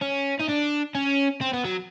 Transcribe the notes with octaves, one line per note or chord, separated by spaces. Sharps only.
C#4
D#4
D4
C#4
C4
B3
F#3